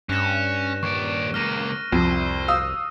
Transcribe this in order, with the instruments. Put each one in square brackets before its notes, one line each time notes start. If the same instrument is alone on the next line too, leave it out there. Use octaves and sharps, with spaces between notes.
[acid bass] G2 [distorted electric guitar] C#4 [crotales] F#6 A#6 E7
[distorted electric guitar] D#2 D5 [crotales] C#6
[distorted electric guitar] C#2 A#3 [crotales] F6 A#6 D#7
[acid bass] C2 [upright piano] F2 [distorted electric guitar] C5
[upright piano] F5 D#6 E6